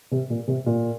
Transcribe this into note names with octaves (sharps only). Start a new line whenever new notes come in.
C3
A#2
C3
A#2